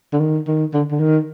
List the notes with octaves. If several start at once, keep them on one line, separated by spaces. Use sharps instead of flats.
D3
D#3
D#3
D3
D3
D#3